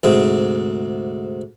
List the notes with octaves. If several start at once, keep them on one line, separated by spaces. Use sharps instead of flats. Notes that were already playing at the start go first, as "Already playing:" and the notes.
D2 G#2 C3